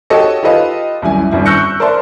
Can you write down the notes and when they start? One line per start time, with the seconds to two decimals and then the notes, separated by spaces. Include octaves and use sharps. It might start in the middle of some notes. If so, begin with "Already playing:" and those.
0.10 F#4 G4 A4 C#5 D#5
0.43 F4 G4 A4 B4 D#5 F5
1.02 C2 F#2 E4 G#5
1.31 G#1 G2 C#3 E4
1.46 C#6 E6 F#6 G6 A#6 C#7
1.80 A#4 C5 D5 E5 A5 C6